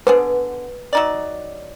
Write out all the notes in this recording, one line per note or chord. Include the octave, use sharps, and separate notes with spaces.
D3 B3 G#4 B4
F#3 D#4 D5